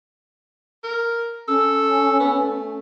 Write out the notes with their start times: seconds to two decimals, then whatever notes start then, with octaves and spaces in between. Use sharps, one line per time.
0.84 A#4
1.48 C#4 A4
2.20 B3
2.40 A3